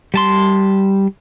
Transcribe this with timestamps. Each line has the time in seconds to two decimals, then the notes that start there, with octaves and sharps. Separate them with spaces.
0.14 G3 A5 C6